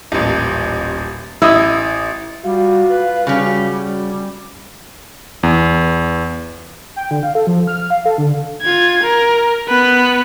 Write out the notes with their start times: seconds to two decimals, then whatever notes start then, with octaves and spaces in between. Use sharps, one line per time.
0.12 D#1 A1
1.42 A1 E4 D#5 D#6
2.45 G3 F4 F#4
2.89 B4
3.27 C#3 G3 C#4 F#4
3.72 G3
5.43 E2
6.96 G5
7.11 D3
7.23 F5
7.35 A4
7.47 F3
7.67 F6
7.90 F5
8.06 A4
8.18 D3
8.62 F4 G#6
9.03 A#4
9.69 B3 B4